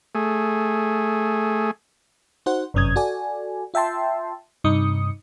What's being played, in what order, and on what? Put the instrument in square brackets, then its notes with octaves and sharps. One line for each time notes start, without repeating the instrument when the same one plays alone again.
[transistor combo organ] A3 G#4
[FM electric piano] D#4 F#4 C5 F#5
G1 F#2 C3 C#4 D#6 G#6
F#4 A4 D5 G#5
F4 E5 G5 A5 C6
G2 C3 D#4 D#6 C#7